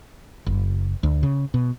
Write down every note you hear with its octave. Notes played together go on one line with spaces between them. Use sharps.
F#1
D2
C#3
B2